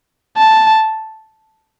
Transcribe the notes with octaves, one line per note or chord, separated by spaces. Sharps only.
A5